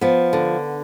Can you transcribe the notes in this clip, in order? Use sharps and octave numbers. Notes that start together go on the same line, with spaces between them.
F3 B3
D3